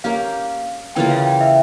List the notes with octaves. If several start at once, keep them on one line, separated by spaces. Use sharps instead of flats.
A#3 C#4 G4 F5
C#3 E3 A#3 F4 G5
F5
G5
E5